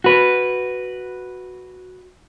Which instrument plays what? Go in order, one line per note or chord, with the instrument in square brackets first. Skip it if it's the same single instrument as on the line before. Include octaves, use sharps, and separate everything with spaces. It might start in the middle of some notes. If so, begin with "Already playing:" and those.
[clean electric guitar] F#4 B4